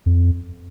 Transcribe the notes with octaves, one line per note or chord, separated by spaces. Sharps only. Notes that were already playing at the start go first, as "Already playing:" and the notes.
F2